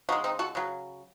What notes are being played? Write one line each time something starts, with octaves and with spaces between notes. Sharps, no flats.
C#3 G#3 D#4 F#4
C4 D#4
F#4 A4
C#3 F#3